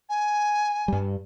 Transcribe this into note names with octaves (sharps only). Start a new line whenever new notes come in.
G#5
G2 G3